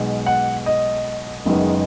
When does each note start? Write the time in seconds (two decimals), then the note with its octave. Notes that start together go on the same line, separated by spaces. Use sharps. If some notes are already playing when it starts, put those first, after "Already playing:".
Already playing: B1 B2 G#3
0.26 F#5
0.66 D#5
1.45 F#1 F#2 D#3 G#3 B3